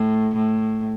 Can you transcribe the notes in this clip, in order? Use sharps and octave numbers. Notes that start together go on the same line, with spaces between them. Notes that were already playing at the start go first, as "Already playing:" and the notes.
Already playing: A2
A2